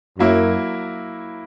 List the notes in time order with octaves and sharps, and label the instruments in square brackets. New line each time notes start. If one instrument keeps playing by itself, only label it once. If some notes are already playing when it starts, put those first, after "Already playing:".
[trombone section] F#2 [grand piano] F#3 A#3 E4